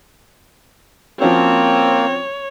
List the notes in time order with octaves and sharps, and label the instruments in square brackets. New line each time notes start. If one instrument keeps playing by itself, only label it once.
[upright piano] F3 C#4 F#4 [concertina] A#3 [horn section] C4 [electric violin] C#5